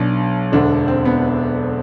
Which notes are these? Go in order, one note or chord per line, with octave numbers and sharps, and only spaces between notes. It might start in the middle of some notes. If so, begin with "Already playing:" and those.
Already playing: B1 B2 D4
E1 D2 D3 D4
C4
B3